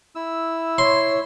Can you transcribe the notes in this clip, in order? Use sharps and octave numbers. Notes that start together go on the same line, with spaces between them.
E4 E6
C#5 C6